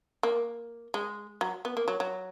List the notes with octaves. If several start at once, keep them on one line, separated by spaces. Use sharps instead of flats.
A#3
G#3
F#3
B3
A#3
F#3
F#3